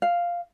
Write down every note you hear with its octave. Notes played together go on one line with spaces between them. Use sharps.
F5